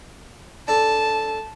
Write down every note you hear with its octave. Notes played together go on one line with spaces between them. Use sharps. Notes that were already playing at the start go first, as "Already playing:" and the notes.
D4 A4 A5